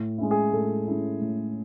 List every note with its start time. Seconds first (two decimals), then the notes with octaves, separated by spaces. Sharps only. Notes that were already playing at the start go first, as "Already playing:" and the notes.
Already playing: A2
0.18 G#3 C#4 E4
0.31 G#4
0.53 A2 A4
0.88 G#3 C#4 E4
1.21 A2